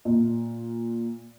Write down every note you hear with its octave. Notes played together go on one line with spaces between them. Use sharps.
A#2